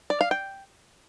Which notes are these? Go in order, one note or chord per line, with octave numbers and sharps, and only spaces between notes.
D5
F5
G5